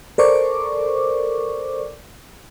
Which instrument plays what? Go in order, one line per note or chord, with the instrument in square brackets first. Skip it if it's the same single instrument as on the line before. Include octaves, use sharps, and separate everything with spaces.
[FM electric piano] A4 A#4 C5 D5 C#6 D6